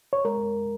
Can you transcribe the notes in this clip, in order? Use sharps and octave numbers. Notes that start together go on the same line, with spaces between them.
C#5
G#3 A#4